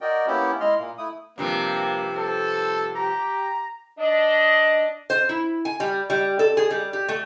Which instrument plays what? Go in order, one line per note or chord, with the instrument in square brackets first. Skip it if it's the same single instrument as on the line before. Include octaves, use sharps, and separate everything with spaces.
[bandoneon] F#4 A#4 D5 D#5 G5
A#3 B3 C#4 E4 G4
G#3 E4 D#5 C6 F6
A#2 A#3
A3 E4 D#6
[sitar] G2 C3 F3 [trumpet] A#3 [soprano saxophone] C5
[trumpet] A4 [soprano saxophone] C5
[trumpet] G4 [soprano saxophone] A#5
[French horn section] D4 D#5
[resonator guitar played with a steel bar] C5
E4
G#5
G3
G3
A4
G#4
G3
G4
A3